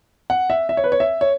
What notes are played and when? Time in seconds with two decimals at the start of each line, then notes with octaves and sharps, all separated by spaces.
0.30 F#5
0.50 E5
0.69 E5
0.77 C#5
0.84 B4
0.92 C#5
1.00 E5
1.21 C#5